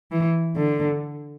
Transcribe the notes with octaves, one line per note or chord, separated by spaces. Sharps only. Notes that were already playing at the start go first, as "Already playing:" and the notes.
E3
D3